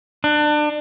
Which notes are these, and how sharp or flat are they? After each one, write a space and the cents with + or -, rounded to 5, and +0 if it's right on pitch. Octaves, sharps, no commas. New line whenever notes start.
D4 +30